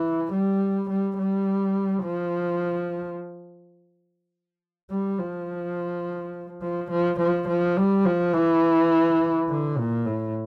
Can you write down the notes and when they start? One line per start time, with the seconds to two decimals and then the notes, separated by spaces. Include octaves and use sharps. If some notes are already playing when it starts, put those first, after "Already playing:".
Already playing: E3
0.33 G3
0.90 G3
1.18 G3
2.04 F3
4.90 G3
5.19 F3
6.62 F3
6.91 F3
7.19 F3
7.48 F3
7.77 G3
8.05 F3
8.33 E3
9.49 D3
9.78 A#2
10.05 A2